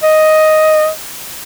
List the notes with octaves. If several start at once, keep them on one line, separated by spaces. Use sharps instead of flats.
D#5